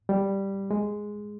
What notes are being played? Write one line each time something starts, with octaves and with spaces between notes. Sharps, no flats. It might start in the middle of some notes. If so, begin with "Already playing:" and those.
G3
G#3